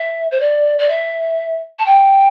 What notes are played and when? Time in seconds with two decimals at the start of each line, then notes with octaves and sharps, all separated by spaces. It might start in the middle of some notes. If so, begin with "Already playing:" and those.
Already playing: E5
0.31 C5
0.40 D5
0.78 D5
0.89 E5
1.79 A5
1.86 G5